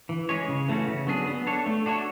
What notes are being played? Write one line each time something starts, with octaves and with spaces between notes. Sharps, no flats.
E3
G#3 C#4 G#4 C#5
C#3
E3 A3 C#4 F#4
C#3
F#3 B3 D4 G#4
B3
D4 A4 C#5
A3
D4 F#4 A4 C#5